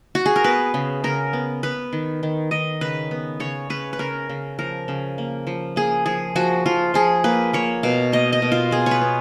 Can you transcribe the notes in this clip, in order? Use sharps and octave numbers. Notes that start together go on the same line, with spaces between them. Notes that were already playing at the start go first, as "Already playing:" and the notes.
F#4
G#4
A#4
B3 B4
C#3
C#3 A#4
B3
B3 B4
D#3
D#3
D#3 D#5
C#3 B4
B3
C#3 C#5
C#3 B4
B4
C#3 A#4
C#3
F3 A#4
C#3
A#3
F3
A#3 G#4
F3 G#4
F3 F#4
F3 F4
F3 G#4
A#3 B4
A#3 C#5
B2 F5
A#3 D#5
D#5
B2
F4
B3 G#4
C#5
B4
B3